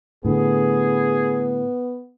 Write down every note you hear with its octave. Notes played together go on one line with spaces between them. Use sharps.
A2 D3 B3 G#4